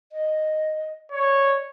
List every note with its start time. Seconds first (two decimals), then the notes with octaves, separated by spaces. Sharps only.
0.12 D#5
1.12 C#5 D5